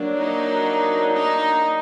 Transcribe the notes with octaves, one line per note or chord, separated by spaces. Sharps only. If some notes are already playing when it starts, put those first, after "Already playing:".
Already playing: F#3 A#3 D4
D#4
D#4